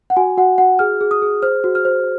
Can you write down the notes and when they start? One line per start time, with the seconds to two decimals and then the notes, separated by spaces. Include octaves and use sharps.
0.10 F#5
0.17 F#4 G#5
0.38 F#4 F#5
0.58 F#4 F#5
0.79 G#4 F6
1.01 G#4
1.11 D#6
1.22 G#4
1.42 C5 F6
1.64 F#4
1.75 F6
1.85 C5